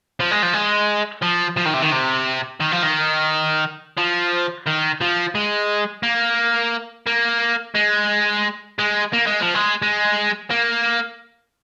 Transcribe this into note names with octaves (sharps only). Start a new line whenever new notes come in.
F3
G#3
F3
G#3
F3
F3
D#3
C3
D#3
C3
D#3
F3
D#3
F3
D#3
F3
G#3
A#3
A#3
G#3
G#3
A#3
G#3
F3
G#3
G#3
A#3